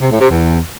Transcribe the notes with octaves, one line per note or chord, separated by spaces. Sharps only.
C3
A2
C3
E2